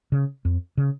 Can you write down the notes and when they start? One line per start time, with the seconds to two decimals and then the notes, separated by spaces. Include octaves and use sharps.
0.12 C#3
0.45 F2
0.77 C#3